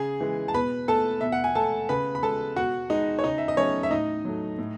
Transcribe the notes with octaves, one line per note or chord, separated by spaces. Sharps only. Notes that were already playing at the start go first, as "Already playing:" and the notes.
Already playing: C#3 G#4 G#5
E3 G#3
A5
B2 B4 B5
A3 A4 A5
B2 E5
F#5
G#5
A3 A4 A5
C#3 B4 B5
B5
G#3 A4 A5
B2 F#4 F#5
G#3 D#4 D#5
C#5
C#3 D#4 D#5
E5
D#5
F#3 A3 C#4 C#5
E5
A2 D#4 D#5
F#3 A3
A2